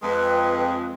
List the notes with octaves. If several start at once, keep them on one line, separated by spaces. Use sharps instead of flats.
F2 G#3 B4